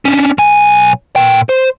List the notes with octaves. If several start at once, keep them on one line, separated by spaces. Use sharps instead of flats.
C#4 D4
B1 G#5
A#2 G5
C5